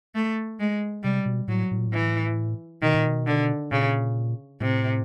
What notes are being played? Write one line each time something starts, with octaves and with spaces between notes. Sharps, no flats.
A3
G#3
C3 G3
B2
A2 F#3
A2
A#2
A2
E3
B2 D#3
A#2
B2
D3
A#2 C#3
A2 C3